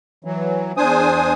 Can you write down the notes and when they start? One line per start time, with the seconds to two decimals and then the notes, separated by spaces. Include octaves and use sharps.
0.24 E3 F#3
0.77 E2 D4 C5 G#5 D#6